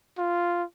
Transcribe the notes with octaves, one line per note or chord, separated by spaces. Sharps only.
F4